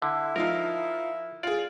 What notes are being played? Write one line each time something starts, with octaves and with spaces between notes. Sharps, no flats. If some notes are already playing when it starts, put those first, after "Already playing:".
D3 E4
F3 D#4 F4 A#4
F4 G#4 D5